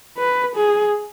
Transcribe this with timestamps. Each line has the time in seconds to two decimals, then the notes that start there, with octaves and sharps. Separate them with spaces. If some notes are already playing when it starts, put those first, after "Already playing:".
0.18 B4
0.56 G#4